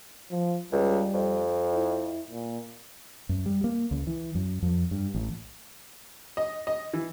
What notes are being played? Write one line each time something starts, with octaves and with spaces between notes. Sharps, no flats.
F3
C#2 G3
F2
E4
A#2
F#2
G3
A#3
C#2
E3
F#2
F2
G2
A1
D#5
D#5
E3